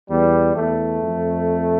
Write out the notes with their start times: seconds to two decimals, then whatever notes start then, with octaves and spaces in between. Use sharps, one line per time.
0.10 E2 G3
0.56 E2 A3
1.02 F2